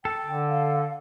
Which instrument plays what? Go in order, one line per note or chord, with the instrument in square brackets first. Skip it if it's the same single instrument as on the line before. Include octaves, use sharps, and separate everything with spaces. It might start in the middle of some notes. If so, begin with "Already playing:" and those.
[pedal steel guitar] A4 [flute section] G5
[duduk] D3
[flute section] F5